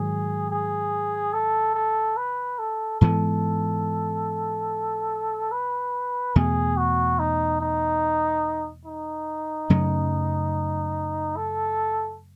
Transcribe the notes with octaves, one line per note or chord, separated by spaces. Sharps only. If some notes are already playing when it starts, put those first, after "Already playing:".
Already playing: G#2 D#3 F#3 G#4
G#4
A4
A4
B4
A4
G#2 E3 G#3 B3 A4
B4
E2 B2 A3 G#4
F#4
D#4
D#4
D#4
F#2 C#3 F#3 A3
A4